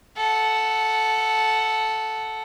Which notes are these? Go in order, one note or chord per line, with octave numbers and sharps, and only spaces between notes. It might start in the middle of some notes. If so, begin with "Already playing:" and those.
A4 F#5